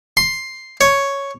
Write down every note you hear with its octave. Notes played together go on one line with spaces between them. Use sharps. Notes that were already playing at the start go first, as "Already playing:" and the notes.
C6
C#5